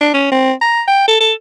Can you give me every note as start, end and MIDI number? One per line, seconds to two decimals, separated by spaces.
0.01 0.14 62
0.14 0.30 61
0.32 0.52 60
0.62 0.82 82
0.88 1.05 79
1.08 1.20 69
1.20 1.34 69